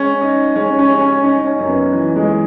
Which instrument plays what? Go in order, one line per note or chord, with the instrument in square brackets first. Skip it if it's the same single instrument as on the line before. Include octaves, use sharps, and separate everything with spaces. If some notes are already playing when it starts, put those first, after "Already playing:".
Already playing: [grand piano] G#3 [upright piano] C#4
[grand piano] D#4
[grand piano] G#3 [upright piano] C#4
[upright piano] C#4
[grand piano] G#3
[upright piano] C#4
[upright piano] C#4 [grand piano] D#4
[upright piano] C#4
[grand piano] F#2
[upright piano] B3
[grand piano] E3
[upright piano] G#3
[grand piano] E3